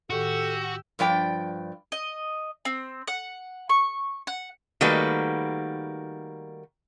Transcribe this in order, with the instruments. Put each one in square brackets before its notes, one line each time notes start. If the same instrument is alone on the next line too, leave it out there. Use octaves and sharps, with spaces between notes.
[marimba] A2 D#3 [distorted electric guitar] F#4 [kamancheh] G4 E6 [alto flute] A4
[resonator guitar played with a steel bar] G2 F3 D5 G5
[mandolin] D#5
C4
F#5
C#6
F#5
[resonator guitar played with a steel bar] D#3 G3 A3 A#3 F#4 B4